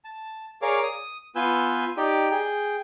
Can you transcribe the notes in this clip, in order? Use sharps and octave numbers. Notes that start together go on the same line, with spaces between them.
A5
G#4 A#4 C#5 D5 F5 D6
D#6
B3 F4 B4 G#5 E6 G6
D#4 G4 D5 G5
G#4 G5